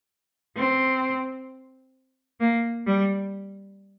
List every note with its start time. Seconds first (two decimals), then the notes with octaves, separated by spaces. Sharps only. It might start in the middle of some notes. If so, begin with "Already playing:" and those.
0.57 C4
2.41 A#3
2.87 G3